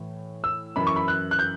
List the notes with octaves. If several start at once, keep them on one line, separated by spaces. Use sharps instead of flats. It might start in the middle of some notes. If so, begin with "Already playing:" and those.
Already playing: A2 E3
E6
F#2 E3 B5
C#6
B5
F#6
F#6
G6